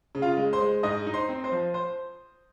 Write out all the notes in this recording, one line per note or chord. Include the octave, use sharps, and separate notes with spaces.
C#3
F4 F5
G#3
C5 C6
G#3
G#2 D#5 D#6
D#4
C5 C6
C4
C5 C6
F3
C5 C6